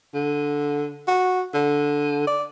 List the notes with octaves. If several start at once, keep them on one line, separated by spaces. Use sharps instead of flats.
D3
F#4
D3
D5